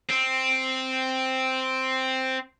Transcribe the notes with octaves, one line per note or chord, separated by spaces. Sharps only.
C4